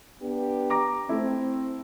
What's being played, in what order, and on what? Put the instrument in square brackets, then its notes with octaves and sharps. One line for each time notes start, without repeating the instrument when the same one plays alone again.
[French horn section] B3 D4 G4
[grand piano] A#5 D6 A#6
[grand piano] A3 E4 [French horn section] C4